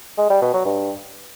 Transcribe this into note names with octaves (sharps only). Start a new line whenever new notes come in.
G#3
G3
B2
F#3
G2